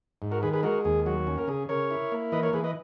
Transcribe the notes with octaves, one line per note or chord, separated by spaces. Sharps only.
G#2
F#4 A#4
D#3 G#4 B4
G#4 B4
G#3 F#4 A#4
D#2 G#4
F#3 F#4
C#4
A#4
C#3 G#4
C#3 A#4 C#5
E4
A#3
E3 B4 D#5
A#4 C#5
E3 G#4 B4
B4 D#5